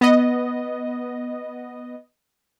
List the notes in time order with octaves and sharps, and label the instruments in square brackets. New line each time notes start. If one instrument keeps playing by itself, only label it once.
[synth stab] B3 D#5